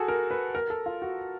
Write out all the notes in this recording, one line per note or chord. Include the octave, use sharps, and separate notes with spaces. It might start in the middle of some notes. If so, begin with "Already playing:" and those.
Already playing: F#4 G#4 A4
A#4
B4
A#4
A4
F4
F#4